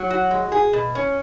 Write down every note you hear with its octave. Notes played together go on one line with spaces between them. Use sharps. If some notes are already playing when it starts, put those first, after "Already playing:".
Already playing: F#3
F#4
G#3
G#4
B2
C#4